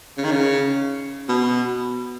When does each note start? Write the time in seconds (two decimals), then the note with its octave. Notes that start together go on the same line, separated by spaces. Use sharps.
0.18 C#3
0.24 D#3
0.31 C#3
1.29 B2